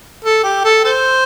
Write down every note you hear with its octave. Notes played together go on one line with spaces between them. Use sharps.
A4
G4
A4
A4 C5